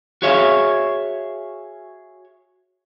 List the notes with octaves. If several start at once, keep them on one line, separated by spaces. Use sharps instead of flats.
F#4 G#4 C#5 E5 F5